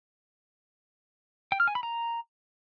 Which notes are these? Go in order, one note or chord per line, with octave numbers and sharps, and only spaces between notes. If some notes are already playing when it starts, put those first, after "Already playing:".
G5
F6
G#5
B5
A#5